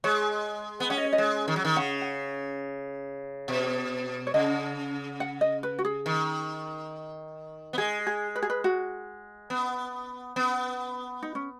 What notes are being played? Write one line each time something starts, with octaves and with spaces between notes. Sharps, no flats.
G#3 C#5
B3
C#4 F#5
D#5
C#5
D#5
G#3
D#3
F#3
D#3
C#3 F#5
F#5
B2
C#5
C#3 D#5
F#5
D#5
B4
F#4
G#4
D#3
B3
G#3 G#4
G#4
B4
G#4
B4
F#4
B3
B3
D#4
C#4